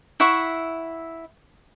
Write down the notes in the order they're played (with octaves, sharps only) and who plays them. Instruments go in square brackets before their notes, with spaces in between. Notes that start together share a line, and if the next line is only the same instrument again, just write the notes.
[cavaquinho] E4 E5 F#5 C#6